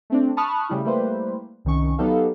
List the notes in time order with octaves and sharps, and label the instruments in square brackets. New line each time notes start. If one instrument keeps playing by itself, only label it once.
[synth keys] A3 C4 D4
A5 B5 C#6 D#6 F6 F#6
C#3 G3 A3 E4
G3 A3 A#3 E4 B4 C5
C2 D#3 C#4 C#6
F#3 B3 D#4 G4 A4 F5